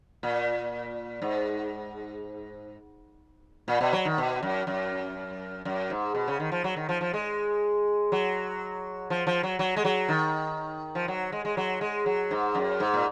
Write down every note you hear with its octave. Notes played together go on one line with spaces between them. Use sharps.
A#2
G#2
A#2
B2
F#3
D#3
B2
F#2
F#2
F#2
G#2
B2
C#3
D#3
F3
F#3
D#3
F3
F3
G#3
F#3
F3
F3
F#3
F#3
G#3
F#3
D#3
F3
F#3
G#3
G#3
F#3
G#3
F#3
G#2
F#2
G#2
A#2